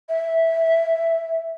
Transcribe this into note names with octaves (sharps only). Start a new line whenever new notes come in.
E5